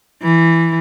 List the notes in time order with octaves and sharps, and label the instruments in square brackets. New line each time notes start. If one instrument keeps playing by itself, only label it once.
[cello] E3